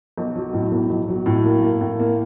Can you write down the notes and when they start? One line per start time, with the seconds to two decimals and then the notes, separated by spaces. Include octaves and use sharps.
0.18 B1
0.35 F#3
0.53 A2
0.72 B1
0.90 B1
1.08 F#3
1.26 A2
1.45 A#3
1.63 A#3
1.81 A2
1.99 A#3